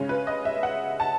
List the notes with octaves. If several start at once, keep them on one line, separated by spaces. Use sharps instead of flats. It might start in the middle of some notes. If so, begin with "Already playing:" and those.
Already playing: C#3 G#3 C#4
B4
D#5
E5
F#5
A5